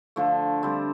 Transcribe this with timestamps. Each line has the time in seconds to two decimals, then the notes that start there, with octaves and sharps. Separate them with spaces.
0.16 D3 F3 A3
0.63 D3 G3 C4